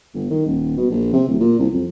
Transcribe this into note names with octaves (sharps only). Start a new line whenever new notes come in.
G1
D#3
D#1
B2
A#1
C3
D1
A#2
C2
F2